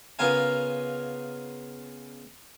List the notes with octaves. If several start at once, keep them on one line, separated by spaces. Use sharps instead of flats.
C#3 B3 F4 A#4 F5 G#5